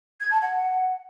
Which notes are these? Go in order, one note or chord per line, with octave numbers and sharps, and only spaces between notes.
G#6
A5
F#5